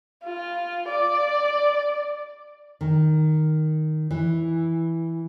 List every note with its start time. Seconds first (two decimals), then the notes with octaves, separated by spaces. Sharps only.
0.24 F4
0.89 D5
2.81 D#3
4.11 E3